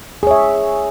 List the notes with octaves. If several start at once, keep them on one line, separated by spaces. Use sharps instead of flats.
G#4 C#5 E5